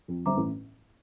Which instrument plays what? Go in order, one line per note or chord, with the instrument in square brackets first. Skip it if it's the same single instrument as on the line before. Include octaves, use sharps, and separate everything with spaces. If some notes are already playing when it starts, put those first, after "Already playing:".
[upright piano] F2
[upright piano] G1 G2 [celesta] C5 E5 A#5 D6
[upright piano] A1 A2